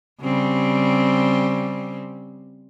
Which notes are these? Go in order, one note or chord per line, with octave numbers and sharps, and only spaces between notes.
C#3 G3 C4